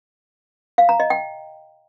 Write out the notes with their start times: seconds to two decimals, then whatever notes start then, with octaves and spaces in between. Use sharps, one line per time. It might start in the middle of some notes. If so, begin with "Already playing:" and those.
0.78 F5
0.89 A#5
1.00 D#5
1.10 G5